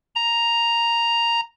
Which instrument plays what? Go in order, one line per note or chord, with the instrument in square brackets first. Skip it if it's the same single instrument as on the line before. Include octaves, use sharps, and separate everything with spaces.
[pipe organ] A#5